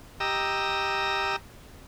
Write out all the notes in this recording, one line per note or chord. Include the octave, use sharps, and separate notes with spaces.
G4 D#5 A#5 E6